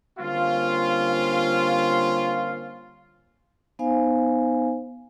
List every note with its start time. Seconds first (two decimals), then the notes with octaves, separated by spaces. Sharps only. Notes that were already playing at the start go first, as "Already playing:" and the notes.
0.19 D3 G3 A#3 C4 C#4 F4
3.79 B3 D#4 C5 F5 G#5